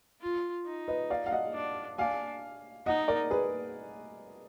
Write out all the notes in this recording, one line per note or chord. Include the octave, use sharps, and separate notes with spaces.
F4
D#4
B4 D#5
D5 F5
F5
D#5 F#5
D4
D4 F5 G#5
D#4 D#5 F#5
A#4 D5
G#4 B4